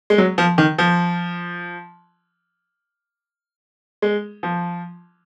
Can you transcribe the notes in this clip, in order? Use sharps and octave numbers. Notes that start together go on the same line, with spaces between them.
G#3
F#3
F3
D#3
F3
G#3
F3